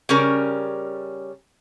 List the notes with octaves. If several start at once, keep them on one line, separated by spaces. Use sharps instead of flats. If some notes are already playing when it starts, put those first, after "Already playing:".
C#3 G3 C#4 A#4